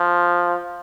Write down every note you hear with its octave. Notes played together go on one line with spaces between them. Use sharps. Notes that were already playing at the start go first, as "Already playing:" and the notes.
Already playing: F3